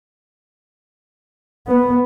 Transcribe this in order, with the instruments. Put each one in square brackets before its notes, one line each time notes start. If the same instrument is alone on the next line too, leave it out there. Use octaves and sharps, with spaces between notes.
[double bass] B3